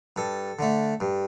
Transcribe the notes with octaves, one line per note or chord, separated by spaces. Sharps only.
G2 A4
D3 A3
G2